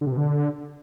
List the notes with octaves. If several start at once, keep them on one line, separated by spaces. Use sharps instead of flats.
D3
C3
B2
D3